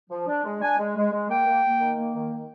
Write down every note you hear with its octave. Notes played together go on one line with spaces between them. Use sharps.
F3
D4
G#3
D4 G#5
G#3
G#3
G#3
A#3 G5
A#3
A#3
D#3
A#3
D#3
D#3